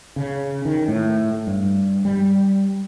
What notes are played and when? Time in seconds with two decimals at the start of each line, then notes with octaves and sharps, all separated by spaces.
0.16 C#3
0.65 D#3
0.88 A2
1.47 G2
2.05 G3